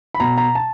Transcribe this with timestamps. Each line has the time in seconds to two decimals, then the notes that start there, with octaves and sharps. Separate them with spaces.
0.14 B5
0.20 B2 A#5
0.38 A#5
0.55 A5